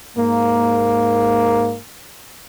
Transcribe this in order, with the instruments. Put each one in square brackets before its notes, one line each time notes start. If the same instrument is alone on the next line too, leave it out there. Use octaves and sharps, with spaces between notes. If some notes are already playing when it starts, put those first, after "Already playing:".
[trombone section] G#2 A#3